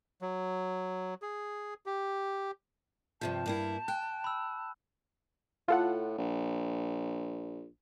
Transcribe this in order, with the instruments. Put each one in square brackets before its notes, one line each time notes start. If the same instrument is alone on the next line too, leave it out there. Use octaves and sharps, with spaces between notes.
[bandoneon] F#3
G#4
G4
[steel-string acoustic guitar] G2 C3 F3 [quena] A5 [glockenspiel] G6
[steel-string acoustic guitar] G2 A#3 E4
[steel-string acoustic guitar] G5 [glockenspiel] F#6
[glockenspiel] B5 E6
[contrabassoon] A2 [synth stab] F4 A4 F#5
[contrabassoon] A#1